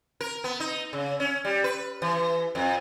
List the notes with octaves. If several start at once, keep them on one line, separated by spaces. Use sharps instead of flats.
A#4
B3
D#4
C#3
C#4
G3
B4
E3
F2